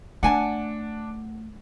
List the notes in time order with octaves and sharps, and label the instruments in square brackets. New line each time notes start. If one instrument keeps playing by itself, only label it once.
[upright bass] A3 [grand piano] D4 [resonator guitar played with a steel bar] F#5 G#5 A5